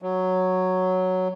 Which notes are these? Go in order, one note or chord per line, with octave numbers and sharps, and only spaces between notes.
F#3